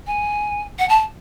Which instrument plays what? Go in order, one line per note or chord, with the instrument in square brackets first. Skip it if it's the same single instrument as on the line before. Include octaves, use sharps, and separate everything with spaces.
[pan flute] G#5
F#5
A5